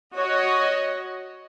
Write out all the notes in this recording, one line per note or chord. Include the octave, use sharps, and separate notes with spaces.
F#4 C#5 D#5